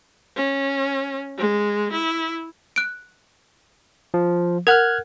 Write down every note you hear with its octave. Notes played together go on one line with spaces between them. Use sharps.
C#4
G#3
E4
F#6 D7
F3
A#4 F#5 F6 F#6 G#6